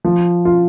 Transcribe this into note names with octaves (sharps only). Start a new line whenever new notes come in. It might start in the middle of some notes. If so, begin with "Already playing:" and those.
F3
F4